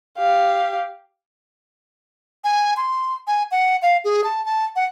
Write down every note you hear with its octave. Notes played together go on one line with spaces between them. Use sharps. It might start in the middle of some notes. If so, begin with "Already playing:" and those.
G4 F5
G#5
C6
G#5
F#5
F5
G#4
A5
A5
F#5